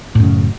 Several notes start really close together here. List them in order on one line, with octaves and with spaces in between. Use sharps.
A2 F#2 C#3